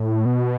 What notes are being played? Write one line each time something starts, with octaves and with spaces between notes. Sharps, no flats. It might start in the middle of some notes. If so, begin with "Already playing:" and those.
Already playing: A2
B2